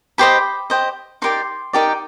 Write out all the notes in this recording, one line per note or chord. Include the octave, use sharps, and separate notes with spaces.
G4 C5 D#5 B5
G4 C5 D#5
D#4 G4 A#4 D5 C6
D#4 G4 A#4 D5